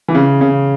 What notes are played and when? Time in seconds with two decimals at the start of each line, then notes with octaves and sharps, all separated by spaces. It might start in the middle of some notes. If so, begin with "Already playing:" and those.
0.08 E3
0.15 C#3
0.41 C#3